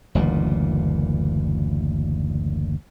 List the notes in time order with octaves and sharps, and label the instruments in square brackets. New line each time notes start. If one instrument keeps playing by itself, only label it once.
[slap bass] F#1 D2 A#2 E3